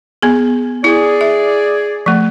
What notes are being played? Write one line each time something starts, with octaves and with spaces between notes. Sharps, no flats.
B3 G#4
E4 G#4 D5
E5
F3 A3